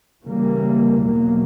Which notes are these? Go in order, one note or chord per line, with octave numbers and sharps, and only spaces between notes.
C#3 E3 G3 A#3
E2 B2 F#3 A#3